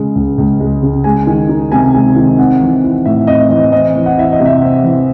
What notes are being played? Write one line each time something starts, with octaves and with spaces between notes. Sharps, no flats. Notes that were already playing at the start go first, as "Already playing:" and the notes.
Already playing: C#3 G#3
C#2
C#2
G#3
C#3
G#3 G#5
D#3
D#4
C3 G#5
G#3
D#3
C4 F#5
E3
E4
A2 E5
C4 D#5
E3 D#5
C4 D#5
E3
F#5
E4 E5
D#5
C3
E5
C4
E3